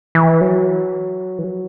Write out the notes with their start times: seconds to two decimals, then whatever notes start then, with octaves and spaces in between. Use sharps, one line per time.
0.15 E3
0.41 F#3
1.39 E3
1.44 F#3